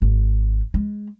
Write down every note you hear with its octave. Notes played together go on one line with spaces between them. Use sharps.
G#1
G#3